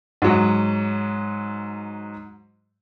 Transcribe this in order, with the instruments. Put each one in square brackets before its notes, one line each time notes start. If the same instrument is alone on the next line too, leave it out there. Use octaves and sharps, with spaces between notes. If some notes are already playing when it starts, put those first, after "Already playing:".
[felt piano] G#2 F#3